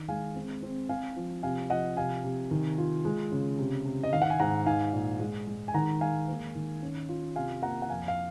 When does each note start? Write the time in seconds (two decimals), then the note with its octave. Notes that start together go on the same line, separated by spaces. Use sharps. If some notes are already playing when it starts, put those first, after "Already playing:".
Already playing: D#3
0.08 G#3 F5 G#5
0.35 C4
0.63 C4
0.89 C4 F5 G#5
1.16 F3
1.43 C3 F5 G#5
1.70 F3 D#5 F#5
1.97 C3 F5 G#5
2.24 C3
2.51 D#3
2.78 F4
3.05 G#3
3.32 C#3
3.59 C3
3.86 C3
4.03 D#5
4.13 D#3 F5
4.22 F#5
4.30 G#5
4.40 G#2 F#5 A#5
4.66 D#4 F5 G#5
4.93 A#2
5.20 G#3
5.47 G#3
5.68 G#5
5.74 D#3 F#5 A#5
6.01 G#3 F5 G#5
6.28 A#3
6.55 D#3
6.82 C#4
7.09 F4
7.36 C3 F5 G#5
7.62 A#3 F#5 A#5
7.82 F#5
7.90 F2 F5 G#5
8.08 F5